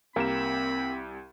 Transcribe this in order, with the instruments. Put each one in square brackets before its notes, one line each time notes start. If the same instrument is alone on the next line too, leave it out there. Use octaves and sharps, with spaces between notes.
[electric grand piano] C2 G4 E7 [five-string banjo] A#3 [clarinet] C4 [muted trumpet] B5